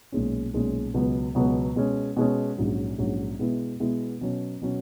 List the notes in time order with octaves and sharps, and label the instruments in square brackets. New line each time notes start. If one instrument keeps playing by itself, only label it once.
[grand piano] B1 A#2 G#3 C#4
B1 A#2 G#3 C#4
C#2 B2 F#3 B3
C#2 B2 F#3 B3
B2 G#3 C#4
B2 G#3 C#4
A#1 G#2 F#3 C#4
A#1 G#2 F#3 C#4
B2 G#3 B3 E4
B2 G#3 B3 E4
B2 F#3 C#4
B2 F#3 C#4